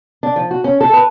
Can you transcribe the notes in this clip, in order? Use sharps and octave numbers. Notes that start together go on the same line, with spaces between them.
D4
F3
F#4
C#4
A4
B4